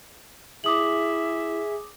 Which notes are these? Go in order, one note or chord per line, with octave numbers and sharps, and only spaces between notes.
E4 G#4 E5 D6 D#6 F#7